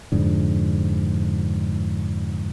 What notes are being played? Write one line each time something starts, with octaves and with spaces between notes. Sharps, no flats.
F2 G#2 D3